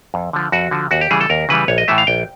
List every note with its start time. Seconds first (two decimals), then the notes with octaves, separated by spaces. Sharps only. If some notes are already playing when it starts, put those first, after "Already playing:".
0.14 F2
0.33 D3 F3
0.52 F2 F#4
0.71 D3 F3
0.91 D#2 F#4
1.01 G4
1.11 C#3 E3 G3 G#4
1.21 A4
1.30 D#2 A#4
1.49 C#3 E3 G3 B4
1.68 A#1 C#5
1.78 D#5
1.88 A2 E3 A3 E5
1.98 F5
2.07 A#1 G5